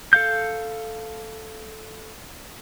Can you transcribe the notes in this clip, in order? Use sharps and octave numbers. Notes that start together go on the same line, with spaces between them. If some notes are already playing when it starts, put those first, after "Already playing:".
A4 F5 G6